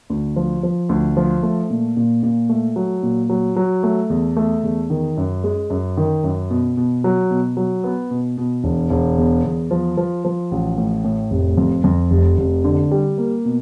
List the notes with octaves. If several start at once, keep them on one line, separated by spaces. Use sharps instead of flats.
D2
F3
F3
D2
F3
A3
A#2
A#2
A#2
A3
F#3
A#2
F#3
F#3
A3
E2
A3
E2
D#3
F#2
G#3
F#2
D#3
F#2
B2
B2
F#3
B2
F#3
B3
B2
B2
E1
E1
E2
E2
F3
F3
F3
A1
A2
A2
F1
F2
F2
F1
F1
D3
G3
A#3
B2